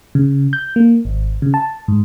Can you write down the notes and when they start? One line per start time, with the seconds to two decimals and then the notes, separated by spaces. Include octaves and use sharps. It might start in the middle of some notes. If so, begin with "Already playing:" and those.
0.15 C#3
0.53 G6
0.76 A#3
1.05 G#1
1.42 C#3
1.54 A5
1.88 G#2